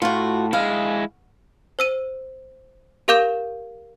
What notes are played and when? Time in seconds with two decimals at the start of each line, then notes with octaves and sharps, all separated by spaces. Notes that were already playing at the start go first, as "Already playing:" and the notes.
0.02 A2 F4 F#4
0.53 G#3 E4 F5
1.79 C5 E6 D#7
3.08 G4 A#4 F5 D6 G6 E7